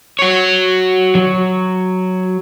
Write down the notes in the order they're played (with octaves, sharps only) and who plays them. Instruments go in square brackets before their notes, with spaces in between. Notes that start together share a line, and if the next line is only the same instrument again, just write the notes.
[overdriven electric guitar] F#4 C#5
[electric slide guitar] F#3